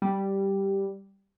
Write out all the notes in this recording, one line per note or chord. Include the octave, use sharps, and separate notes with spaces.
G3